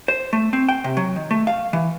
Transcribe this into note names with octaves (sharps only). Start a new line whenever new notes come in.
C5
A3
C4
G5
C3
F#3
D#3
A3
F5
E3